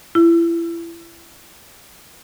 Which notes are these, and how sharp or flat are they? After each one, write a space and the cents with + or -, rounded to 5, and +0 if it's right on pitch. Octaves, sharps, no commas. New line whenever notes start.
E4 +30